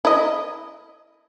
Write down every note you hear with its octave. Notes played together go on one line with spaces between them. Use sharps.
E4 D#5